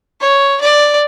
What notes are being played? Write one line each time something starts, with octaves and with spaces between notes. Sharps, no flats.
C#5
D5